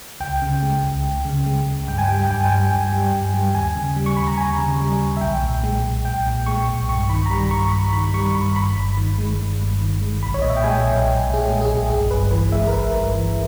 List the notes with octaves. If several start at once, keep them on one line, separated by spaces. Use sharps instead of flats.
C#2 G5
C#3
G#3
C#2
C#2
C#3
G#3
C#2
G2 G5
G#5
G3 G5
G#5
G2 G5
G#5
G3 G5
G2 G#5
G3
G2
G3
D#2 G#5
C#3
G3
C#6
D#2 B5
A#5
D#2 G#5
C#3
G3
D#2
E5
B1 G5
A#2
G#3
B1
B1 G5
A#2
G#3 C#6
B1
G2 C#6
D#3 B5
A#5
G3 B5
G2 C#6
G2 B5
D#3 B5
G3 C#6
G2 B5
G1 B5
G2
D#3
G#3
G1
G2
D#3
G#3
B1 B5
C#5
A#2 D#5
E5
G5
G#3 G#5
B1
B1
A#2
G#4
G#3
G#4
B1
G1 G#4
G2 B4
E3 B4
G#3 E5
A#4
G1 B4
G2
E3